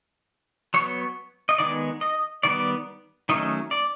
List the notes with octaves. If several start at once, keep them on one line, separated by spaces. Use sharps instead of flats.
F#3 B3 C#5
D#5
D#3 G#3 B3 D5
D#5
D#3 G3 B3 D5
D#3 F#3 A3 C#4 D#5
D5